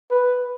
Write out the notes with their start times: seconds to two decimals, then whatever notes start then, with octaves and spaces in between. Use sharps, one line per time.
0.11 B4